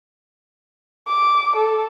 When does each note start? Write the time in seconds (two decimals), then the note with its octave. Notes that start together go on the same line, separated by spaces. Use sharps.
1.09 D6
1.56 A4